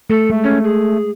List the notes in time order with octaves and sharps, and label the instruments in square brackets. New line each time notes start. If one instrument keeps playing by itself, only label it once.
[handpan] A3 [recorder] A4
[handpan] G#3 [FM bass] A3
[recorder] C#4
G#4